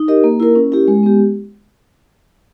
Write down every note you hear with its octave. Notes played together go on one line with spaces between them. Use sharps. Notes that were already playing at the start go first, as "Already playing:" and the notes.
Already playing: D#4
G4 A#4 D#5
A#3
E4 A#4
C#4
E4 G4
G#3
B3 G4